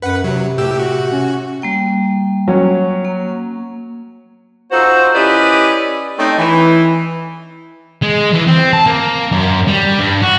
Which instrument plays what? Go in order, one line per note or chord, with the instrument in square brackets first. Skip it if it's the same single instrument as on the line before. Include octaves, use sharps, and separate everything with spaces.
[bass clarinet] F#2 [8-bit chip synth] B4 F#5
[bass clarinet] C3 [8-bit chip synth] F#3
[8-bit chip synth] A2 G4 E6
F#4
[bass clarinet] C#4
[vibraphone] G3 A#3 G5
[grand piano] F#3 C#4
[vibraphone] A#3
[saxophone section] D#4 F4 F#4 A4 C5
C#4 E4 G4 B4 D5 D#5
A3 C4 C#4 D#4
E3
[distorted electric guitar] G#3
E3
C4
A5
A#3
F#2
G3
G2
F#4